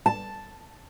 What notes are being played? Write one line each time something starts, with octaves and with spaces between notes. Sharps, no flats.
A5